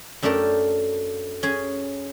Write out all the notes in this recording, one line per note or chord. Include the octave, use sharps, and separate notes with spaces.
F#2 A3 D4 G4 A#4 A5
C#4 G#4 G#5